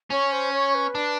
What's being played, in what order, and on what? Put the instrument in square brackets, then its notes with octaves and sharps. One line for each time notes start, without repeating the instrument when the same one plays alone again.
[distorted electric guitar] C#4 [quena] C#5
[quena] C5
C#5
B4
[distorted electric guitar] D4